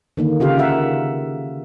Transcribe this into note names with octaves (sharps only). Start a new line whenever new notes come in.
D3 D#3 A#3
C#3 F4 G4 F5
F4 A#4 E5 F#5